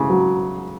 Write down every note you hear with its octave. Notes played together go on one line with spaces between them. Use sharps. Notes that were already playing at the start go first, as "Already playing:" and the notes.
Already playing: C#3
F#3